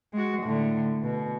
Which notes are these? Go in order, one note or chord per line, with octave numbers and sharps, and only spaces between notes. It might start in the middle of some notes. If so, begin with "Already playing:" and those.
G#3 F#4
A2 D3
B2